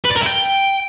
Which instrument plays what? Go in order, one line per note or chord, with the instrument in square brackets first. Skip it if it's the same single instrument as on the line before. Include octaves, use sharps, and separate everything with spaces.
[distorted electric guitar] B4
D5
A#4
E4
G5